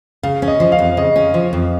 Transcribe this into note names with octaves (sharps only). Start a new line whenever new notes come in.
C#3 F5
C#4
D#5
F3
F5
F2
C#3 D#5
C#4
F3
F2